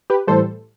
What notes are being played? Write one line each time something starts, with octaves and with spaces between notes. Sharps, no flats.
G4 B4
A2 E3 G3 A4 C5